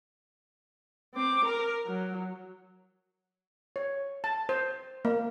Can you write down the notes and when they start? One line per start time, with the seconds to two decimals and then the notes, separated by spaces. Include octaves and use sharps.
1.14 C4 D6
1.45 A#4 A#5
1.86 F#3
3.76 C#5
4.24 A5
4.49 C5
5.05 A#3